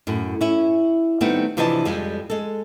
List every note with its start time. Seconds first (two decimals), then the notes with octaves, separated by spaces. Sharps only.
0.07 F#2 A2
0.41 C#4 E4
1.21 D#3 G3 A3 B3 C4
1.57 C3 E3 F3 D4 D#5 A5
1.85 F2 G3 G#3
2.30 G#3 A4